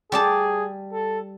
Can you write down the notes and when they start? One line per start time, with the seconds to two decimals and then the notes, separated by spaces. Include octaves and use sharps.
0.12 G3 G#4 D5 A5
0.93 A4